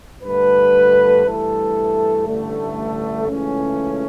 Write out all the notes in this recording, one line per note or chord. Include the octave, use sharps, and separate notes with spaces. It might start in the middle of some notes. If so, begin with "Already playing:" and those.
G2 D3 A3 B4
G2 E3 A3 A4
A1 G2 D3 A3
C#2 C#3 E3 A3 C#4